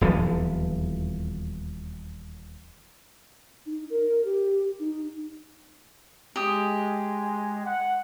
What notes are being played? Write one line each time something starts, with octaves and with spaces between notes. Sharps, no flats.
D#1 E2 E3 F3
D#4
A#4
G4
D#4
G#3 G4 D#6
F#5